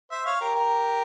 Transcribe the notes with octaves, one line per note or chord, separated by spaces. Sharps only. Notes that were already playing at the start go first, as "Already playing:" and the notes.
C5 E5
C#5 F5
G4 A#4
G4 A#4